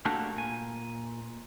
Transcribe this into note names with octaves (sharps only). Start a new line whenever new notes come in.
A3 A#3 D4 F#4 G4 A4
A#2 G#5